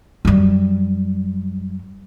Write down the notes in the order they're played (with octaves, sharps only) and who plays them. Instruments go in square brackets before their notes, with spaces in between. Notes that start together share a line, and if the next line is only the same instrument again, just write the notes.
[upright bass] F#2 G3